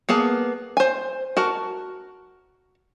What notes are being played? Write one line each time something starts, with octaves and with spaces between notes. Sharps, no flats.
A#3 B3 G#4 A5
C5 G#5
F#4 A#4 A5